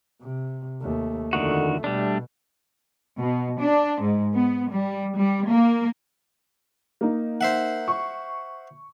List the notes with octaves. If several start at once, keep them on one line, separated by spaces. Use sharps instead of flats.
C3
D#2 A3
F2 D3 D#3 A3 F#4
B2 G3 A3 D4
B2
D4
G#2
B3
G3
G3
A#3
A#3 D#4
C5 E5 F#5
C#6